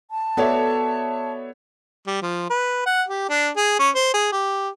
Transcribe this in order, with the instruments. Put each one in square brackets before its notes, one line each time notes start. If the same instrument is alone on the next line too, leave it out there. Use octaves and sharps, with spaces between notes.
[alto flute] A5
[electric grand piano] B3 C#5 E5 [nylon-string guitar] F#4 A4 D5
[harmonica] G3
F3
B4
F#5
G4
D4
G#4
C#4
C5
G#4
G4